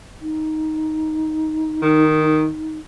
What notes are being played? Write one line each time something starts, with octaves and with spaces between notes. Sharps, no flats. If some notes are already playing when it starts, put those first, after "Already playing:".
D#4
D#3